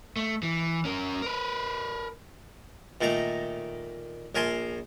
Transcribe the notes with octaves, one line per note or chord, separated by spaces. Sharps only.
A3
E3
C#4 A#4
A#4 B4
A#2 D#3 A3 A#5
A#1 A#4 G#5 A5 C6